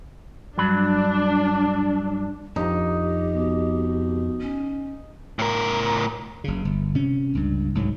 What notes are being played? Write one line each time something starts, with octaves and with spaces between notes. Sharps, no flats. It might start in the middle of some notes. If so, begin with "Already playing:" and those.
G2 F#3 D4 B5
F2 D#4 G4
B2
C#4
A2 A#4
F#1 C#3
G1
C3 C#4
C#2 G2
C2 G#2 F#3